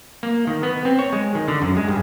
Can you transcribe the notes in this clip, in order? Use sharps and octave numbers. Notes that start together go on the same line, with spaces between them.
A#3
D#3
B3
C4
C#5
G#3
D#3
D3
F#2
G#3
G2